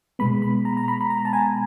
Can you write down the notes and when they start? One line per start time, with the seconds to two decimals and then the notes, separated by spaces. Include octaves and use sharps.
0.19 B2 G#3 B3 B5
0.42 B5
0.65 A#5
0.77 A#5
0.88 B5
1.01 B5
1.10 A#5
1.25 A5
1.33 G#5